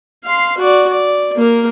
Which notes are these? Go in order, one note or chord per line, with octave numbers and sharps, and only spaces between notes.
F5 C6
F#4 D5
D5
A#3 A#4